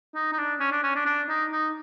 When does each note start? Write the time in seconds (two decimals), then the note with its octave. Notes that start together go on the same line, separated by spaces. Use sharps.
0.15 D#4
0.33 D#4
0.38 D4
0.60 C#4
0.72 D4
0.83 C#4
0.95 D4
1.06 D4
1.29 D#4
1.52 D#4